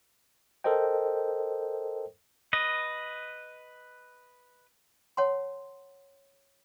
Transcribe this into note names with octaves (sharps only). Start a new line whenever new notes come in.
A4 A#4 C5 D#5 G5
B4 D#5
C#5 F#5 A5 C6